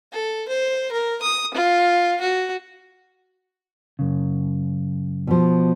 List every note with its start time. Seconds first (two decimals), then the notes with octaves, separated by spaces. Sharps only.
0.13 A4
0.48 C5
0.92 A#4
1.22 D#6
1.54 F4
2.21 F#4
3.99 F#2 C#3
5.27 B2 F3